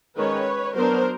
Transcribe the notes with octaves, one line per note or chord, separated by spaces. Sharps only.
D#3 G#3 C#4 B4 C#5
F#3 B3 D4 A#4 C5